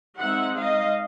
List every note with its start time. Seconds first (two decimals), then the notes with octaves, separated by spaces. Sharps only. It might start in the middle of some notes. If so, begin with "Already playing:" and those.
0.17 G#3 C4 D#4 E5 F#5
0.55 D#5 F5